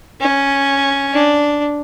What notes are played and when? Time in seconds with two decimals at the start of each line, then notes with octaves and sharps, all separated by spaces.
0.21 C#4
1.13 D4